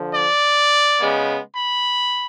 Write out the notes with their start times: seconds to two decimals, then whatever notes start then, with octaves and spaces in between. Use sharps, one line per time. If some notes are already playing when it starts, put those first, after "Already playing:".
Already playing: D3 F3
0.14 D5
0.99 C#3 G#3 B3
1.56 B5